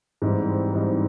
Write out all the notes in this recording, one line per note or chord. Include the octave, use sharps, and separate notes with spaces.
G#2 E3 G3 C4 D#4
G#2 E3 G3 C4 D#4